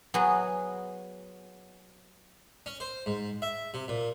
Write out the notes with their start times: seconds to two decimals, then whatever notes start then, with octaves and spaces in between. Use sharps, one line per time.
0.14 F#3 B3 F#4 G#4 G#5
2.66 C#4
2.80 C5
3.06 G#2
3.42 E5
3.74 C3
3.88 A#2